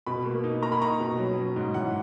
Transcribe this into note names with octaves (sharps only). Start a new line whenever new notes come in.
B2 B5
A#3
D#4
A#3 A#5
B5
D#4 A#5
B2
F#3
C#4
G#2
E3 F#5